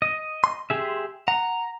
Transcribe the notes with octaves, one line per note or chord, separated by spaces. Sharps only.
D#5
C6
G4 G#4 E5
F#5 A#5